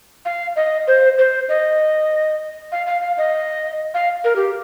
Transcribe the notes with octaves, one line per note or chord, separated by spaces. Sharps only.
F5
D#5
C5
C5
D#5
F5
F5
F5
D#5
F5
A#4
G4